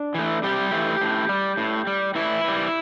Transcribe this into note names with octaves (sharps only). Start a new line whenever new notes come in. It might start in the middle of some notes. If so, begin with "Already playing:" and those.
Already playing: D4
E3 A3
C3 G3 G4
E3 A3
A2
G3
A2
G3
A2 E3 E4
E3 G3